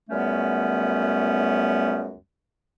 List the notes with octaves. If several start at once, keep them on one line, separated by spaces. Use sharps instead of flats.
C#2 F#2 G3 A3 B3 C#4